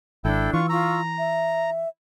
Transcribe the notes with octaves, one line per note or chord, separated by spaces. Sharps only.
G#1 D4 E4 A4 G5
E3 F4 C#6
F4 A#5 C#6 E6
E5